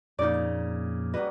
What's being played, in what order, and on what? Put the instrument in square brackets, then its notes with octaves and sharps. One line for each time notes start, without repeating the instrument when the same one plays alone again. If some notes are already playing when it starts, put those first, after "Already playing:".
[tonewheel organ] F2 A#2 [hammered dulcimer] C#3 A#3 [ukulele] D#4 D5
[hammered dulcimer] D#5
[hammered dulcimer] F#3 G3 [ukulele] B4 D#5